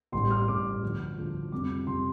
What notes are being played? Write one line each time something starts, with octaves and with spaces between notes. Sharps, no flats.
A1 G2 G3 C6
F6
A1 G2 G3 D6
D2 D3 F3
D2 D3 F3
F2 C3 G3 D6
F2 C3 G3 C6